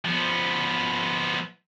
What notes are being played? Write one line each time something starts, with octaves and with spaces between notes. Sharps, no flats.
F3 B3